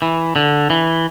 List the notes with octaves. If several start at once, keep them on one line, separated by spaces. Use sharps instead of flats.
E3
D3
E3